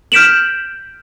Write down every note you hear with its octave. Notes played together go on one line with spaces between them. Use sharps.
F6 G6 B6 D7 E7 F#7